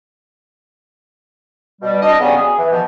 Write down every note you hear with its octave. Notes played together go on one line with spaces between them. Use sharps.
B2 G3
D4 D#5
C#3 F#3 G3 B3 C#4
G#4
E3
B2 F3